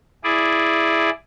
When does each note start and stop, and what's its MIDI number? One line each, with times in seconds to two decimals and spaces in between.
0.24 1.10 64
0.24 1.10 68
0.24 1.10 74